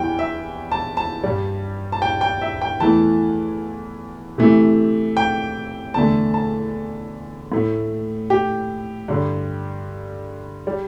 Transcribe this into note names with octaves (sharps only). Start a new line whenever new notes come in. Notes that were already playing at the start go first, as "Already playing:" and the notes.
Already playing: E2 E3 G3 G5
E5
A5
A5
G2 G3
A5
G5
G5
E5
G5
E2 E3 A3 A5
C3 E3 A3
G5
E2 D3 A3 A5
A5
A2 A3
G4
G2 D3 G3
G3